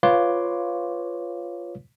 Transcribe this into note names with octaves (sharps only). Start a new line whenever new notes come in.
F4 B4 C#5 F5 C6 D6